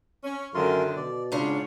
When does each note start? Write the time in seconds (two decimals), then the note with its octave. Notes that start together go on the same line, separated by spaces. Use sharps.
0.24 C#4
0.54 F#2 D3 D#3 F4 A#4 C6
0.96 B2 D5
1.32 G#2 C#3 D4 F4 C#5 F5